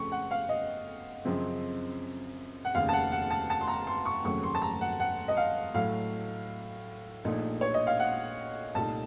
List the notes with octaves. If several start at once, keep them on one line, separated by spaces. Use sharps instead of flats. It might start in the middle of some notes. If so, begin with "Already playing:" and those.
Already playing: F2 C#3 A3 C#4 C#6
F#5
F5
D#5
F#2 C#3 F3 C4
F#5
F1 D#2 C#3 F5
A5
F#5
F#5
A5
A5
C6
A#5
C6
C#6
F1 D#2 C#3 F#3 A3 C#6
C6
A5
A#5
F#5
F#5
D#5
F5
A2 F#3 A3 F5
A#1 A#2 A3 D#4
C#5
D#5
F5
F#5
C2 A#2 A3 D#4 A5